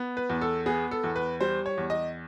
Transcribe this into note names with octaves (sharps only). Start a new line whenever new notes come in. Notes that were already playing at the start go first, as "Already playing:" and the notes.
Already playing: B3
B4
E2
A4
B3 G#4
A4
E2
B4
G3 C5
C#5
E2
D#5